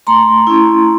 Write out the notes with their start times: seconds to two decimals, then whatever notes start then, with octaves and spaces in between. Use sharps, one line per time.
0.07 A3 A#5 C6
0.47 C#4 E4